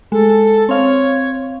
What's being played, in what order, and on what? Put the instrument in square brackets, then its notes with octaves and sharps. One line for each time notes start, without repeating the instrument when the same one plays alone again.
[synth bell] G#3 [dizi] A4
[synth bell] C4 F5 [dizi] C#5